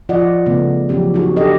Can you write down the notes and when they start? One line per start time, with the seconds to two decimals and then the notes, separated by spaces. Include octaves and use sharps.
0.09 F3 F4 D5 D#5 F#5
0.46 C#3 A3 B3
0.89 F3 F#3 C#4 G4
1.14 D#4 F#4 G#4
1.36 D4 G4 A4 D#5